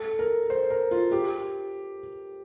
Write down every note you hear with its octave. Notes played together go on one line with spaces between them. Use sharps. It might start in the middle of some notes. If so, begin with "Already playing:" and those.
Already playing: A4
A#4
C5
A#4
F4
G4